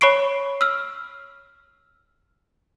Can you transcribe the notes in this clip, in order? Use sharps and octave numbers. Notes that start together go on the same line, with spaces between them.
C#5 B5 C#6 C7 D7
E6 F6